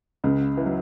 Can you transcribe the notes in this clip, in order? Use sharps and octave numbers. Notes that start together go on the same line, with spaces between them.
C#2 C#3
E3
F#3